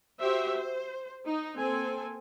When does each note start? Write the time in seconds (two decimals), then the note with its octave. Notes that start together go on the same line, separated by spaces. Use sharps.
0.20 F#4 G4 C5 E5
0.52 C5
1.27 D#4
1.58 A#3 C4 A4 G#5